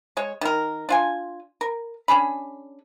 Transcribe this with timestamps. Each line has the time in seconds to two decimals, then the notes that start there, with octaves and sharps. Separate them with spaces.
0.17 G#3 C#5
0.41 D#3 A#4
0.89 D4 F4 G#5
1.61 A#4
2.08 C#4 D4 G#4 B5